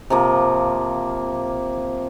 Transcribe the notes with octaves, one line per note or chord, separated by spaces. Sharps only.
C3 F3 A#3